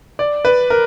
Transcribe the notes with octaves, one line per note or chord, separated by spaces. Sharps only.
D5
B4
A#4